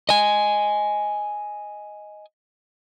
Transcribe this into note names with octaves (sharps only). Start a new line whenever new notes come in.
D#5 G#5